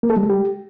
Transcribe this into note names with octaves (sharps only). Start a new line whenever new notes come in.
A#3
A4
G3
G#3
G4